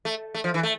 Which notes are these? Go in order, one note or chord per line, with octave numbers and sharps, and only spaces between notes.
A3
A3
F3
E3
A3